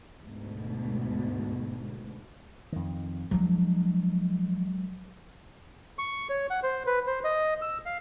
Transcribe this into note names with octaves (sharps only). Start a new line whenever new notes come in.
D2 G#2 B2
F2 D#3
F3 F#3 G#3 D4
C#6
C#5
F#5
C5
B4
C5
D#5
E6
F5